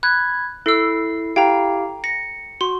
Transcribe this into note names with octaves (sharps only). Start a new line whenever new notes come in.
B5 F#6 G#6
E4 A4 E6 C7
E4 G4 F5 G5 A#5
A#6 C#7
F#4 C6